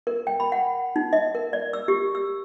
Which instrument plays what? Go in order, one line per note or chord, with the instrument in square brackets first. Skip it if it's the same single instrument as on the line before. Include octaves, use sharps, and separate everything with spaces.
[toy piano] A#4
G5
B5
F#5
D#4
D#5
A#4
D5
E6
G4
E6